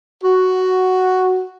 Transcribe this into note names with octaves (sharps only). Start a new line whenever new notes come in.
F#4